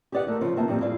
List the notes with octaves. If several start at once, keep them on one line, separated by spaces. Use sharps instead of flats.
G4 G#4 B4 D5 D#5 F#5
A3 E4 A#4
C#3 F3
C3 A#3 B3 D#4 E5 A5
F2 A#2 G3
E4 F4 G#4 D5 F5